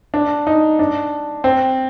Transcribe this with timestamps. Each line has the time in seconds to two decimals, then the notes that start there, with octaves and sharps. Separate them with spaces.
0.14 D4
0.47 D#4
0.79 D4
1.44 C4